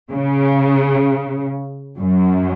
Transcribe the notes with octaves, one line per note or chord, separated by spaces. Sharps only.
C#3
F#2